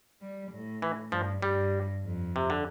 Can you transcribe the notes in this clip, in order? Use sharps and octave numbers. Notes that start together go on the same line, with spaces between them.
G3
A2
E3
G2 F3
G2 G3
F2
C3
D3